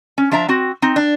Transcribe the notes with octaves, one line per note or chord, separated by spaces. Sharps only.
C#4
F3 D4 E5 A#5
C4 F#4
C4 D#4
D4